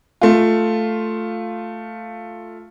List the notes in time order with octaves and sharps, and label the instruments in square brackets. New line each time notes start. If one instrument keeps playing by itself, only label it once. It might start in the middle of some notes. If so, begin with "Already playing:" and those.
[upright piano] A3 F4